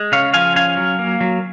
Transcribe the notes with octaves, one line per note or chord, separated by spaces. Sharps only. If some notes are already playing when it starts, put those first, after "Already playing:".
Already playing: G#3
C#3 C#5 F5
F3 F5 G#5
C#4 F5 G#5
F#3
A#3
F#3